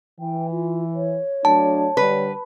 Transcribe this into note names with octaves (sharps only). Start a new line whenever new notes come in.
E3 G5
F4
C#5
F#3 A3 D4 A5
D3 G3 B4